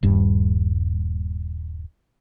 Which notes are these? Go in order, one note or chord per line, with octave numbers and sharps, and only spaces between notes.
D#1 G2